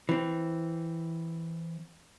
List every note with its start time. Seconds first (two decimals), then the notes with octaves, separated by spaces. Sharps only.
0.09 E3 C4